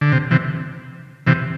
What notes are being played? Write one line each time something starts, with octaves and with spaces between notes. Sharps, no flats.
D3
C3
C3 E3
C3 E3